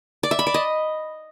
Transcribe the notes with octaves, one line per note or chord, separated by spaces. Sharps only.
D5
E5
B5
D5
D#5